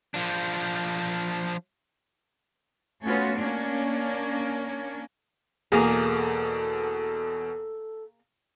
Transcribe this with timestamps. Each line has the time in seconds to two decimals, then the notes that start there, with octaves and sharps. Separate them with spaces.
0.14 F3 D4
3.04 A3 B3 C#4 F4 F#4
3.38 A#3 C#4 D4
5.72 E2 B2 A#3 G#4 A4